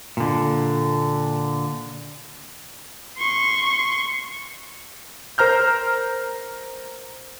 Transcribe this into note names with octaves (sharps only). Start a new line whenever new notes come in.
A#2 D3
C6 C#6
A#4 C5 A#5 F6 G6